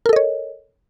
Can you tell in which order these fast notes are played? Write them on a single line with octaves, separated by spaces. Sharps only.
A#4 A4 D#5 C#5